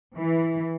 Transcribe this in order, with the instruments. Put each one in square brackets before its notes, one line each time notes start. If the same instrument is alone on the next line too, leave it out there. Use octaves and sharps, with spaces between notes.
[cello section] E3